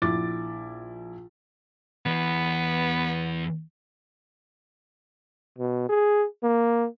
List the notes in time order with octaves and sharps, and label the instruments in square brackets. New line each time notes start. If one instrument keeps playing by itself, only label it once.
[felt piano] A#1 E4 D6 A6
[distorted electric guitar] E2 E3 [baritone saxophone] B3
[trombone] B2
G#4
A#3